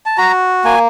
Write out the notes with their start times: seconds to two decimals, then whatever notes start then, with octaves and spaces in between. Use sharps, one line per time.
0.06 A5
0.18 F#4 A#5
0.65 A#3 G#5